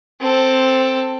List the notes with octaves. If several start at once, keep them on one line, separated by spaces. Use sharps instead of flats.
C4 A4